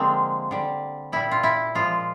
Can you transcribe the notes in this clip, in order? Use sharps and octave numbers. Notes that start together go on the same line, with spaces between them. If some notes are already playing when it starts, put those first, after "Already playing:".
Already playing: D3 F3 G#3 A#3 C4
D3 G3
A#2 G3 E4
F4
E4
A#2 F3 G#3 F4